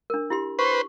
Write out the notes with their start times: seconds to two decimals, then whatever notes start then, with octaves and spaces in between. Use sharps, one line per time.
0.10 D4 A#4
0.30 E4 G4 C6
0.59 B4 C5 C#6